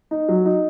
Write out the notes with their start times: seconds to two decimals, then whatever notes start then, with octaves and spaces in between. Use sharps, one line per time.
0.11 D#4
0.29 F#3
0.46 D#4